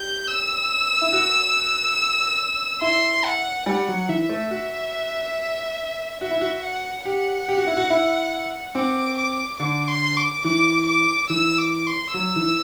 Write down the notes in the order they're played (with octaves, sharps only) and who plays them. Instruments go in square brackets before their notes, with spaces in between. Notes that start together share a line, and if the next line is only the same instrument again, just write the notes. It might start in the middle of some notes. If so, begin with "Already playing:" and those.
Already playing: [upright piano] G4 [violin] G6
[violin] E6
[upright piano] E4
F#4
[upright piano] E4 [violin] C6
[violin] F#5
[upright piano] G3 [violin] F#5
[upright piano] F#3
[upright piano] E3 [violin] E5
[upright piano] A3
F#4
[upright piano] F#4 [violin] E5
[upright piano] E4
F#4
[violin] F#5
[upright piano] G4 [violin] F#5
[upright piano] G4
F#4
E4
F#4
E4
[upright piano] C4 [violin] D6
[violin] D6
[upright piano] D3 [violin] D6
[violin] C6
D6
[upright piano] E3 [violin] D6
[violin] D6
[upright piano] E3 [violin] E6
[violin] D6
C6
[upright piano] F#3 [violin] E6
[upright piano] E3